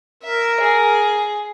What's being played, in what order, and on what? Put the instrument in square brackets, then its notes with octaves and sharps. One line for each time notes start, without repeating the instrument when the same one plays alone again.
[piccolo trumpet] A#4 [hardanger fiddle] E5
[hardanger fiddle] G#4